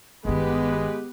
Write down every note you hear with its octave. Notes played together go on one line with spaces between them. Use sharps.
G1 D#3 G#3 B3 G4 B4